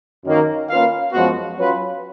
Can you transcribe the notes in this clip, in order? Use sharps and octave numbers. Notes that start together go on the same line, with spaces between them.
F#2 D#3 A#3
A#3 C#4 F4 B4 F5
F#2 F3 G#3 B3 F#4
F#3 C#4 F4 B4